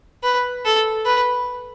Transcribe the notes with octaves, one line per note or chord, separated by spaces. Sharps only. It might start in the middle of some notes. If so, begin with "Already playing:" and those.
B4
A4
B4